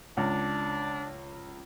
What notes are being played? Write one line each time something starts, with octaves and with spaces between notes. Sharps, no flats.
C#2 D4